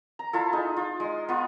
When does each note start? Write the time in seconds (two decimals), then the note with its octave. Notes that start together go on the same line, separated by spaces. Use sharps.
0.19 A#5
0.33 E4 F4 A4
0.53 D#4 G#4
0.77 F4
1.00 G#3
1.29 B3 F4